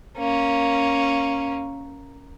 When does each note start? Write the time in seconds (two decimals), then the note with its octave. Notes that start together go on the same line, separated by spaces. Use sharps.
0.17 A#3 C#4